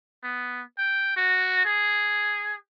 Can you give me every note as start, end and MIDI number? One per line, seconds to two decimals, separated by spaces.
0.23 0.61 59
0.78 1.14 79
1.16 1.64 66
1.65 2.55 68